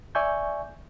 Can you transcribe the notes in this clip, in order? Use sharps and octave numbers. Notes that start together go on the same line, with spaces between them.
D5 E5 G#5 C#6 G6